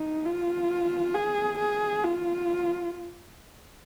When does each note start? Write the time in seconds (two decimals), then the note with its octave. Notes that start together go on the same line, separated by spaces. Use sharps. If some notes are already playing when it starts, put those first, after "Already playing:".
Already playing: D#4
0.25 F4
1.14 G#4
1.59 G#4
2.03 F4